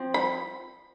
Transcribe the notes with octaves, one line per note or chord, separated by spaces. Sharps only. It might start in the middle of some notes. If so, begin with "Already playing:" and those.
Already playing: F3 C4
B5